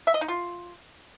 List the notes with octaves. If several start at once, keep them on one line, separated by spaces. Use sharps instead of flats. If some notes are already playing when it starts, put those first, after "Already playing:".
E5
D#5
D#4
F4